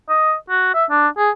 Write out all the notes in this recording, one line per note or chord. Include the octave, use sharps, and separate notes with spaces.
D#5
F#4
E5
D4
G#4